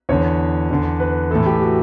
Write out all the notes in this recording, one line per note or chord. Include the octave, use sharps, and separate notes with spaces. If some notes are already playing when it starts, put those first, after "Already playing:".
E2 D3 C#5
E2 D3
B4
A2 E3 A4
G4
F#4